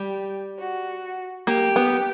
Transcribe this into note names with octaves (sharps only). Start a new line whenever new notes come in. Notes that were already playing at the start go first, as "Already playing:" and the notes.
Already playing: G3 G4
F#4
A#3 G4
B3